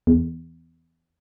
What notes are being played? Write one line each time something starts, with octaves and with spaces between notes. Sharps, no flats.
E2